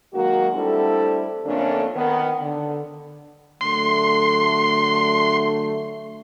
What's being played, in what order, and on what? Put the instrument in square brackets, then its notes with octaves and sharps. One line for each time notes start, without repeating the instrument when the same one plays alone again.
[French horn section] D#3 F#3 G#3 A#3 F#4
G3 A3 C4 D4 E4 A4
F2 D3 A3 A#3 C#4 D4
D#3 B3
D3
[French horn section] D3 F#3 A3 [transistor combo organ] C6